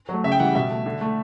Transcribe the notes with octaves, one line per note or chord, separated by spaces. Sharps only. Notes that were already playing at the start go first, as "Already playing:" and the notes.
F#3 A3
C#3 E5
G5
E3 G3 F#5
B2 E5
A3
D3
A3